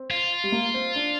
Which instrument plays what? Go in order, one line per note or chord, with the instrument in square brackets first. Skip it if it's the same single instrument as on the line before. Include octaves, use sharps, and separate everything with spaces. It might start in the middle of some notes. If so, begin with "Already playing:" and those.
Already playing: [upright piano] C4
[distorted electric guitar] F4
[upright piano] G3
A#3
C4
D4